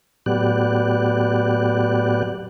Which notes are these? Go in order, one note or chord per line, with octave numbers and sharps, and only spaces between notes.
A2 F#3 B3 G4 D5 F#6